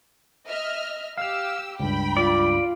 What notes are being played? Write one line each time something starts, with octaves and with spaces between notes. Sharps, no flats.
D#5 E5 F6
G4 F5 E6 F6
C#2 G2 G5 B5
F4 D5